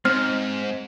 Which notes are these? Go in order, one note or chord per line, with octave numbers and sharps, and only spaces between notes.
G#2 C4 F6